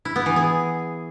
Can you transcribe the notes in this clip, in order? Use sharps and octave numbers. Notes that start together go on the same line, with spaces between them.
E4
B3
E3
G#4